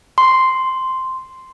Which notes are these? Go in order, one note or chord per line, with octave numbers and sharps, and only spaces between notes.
C6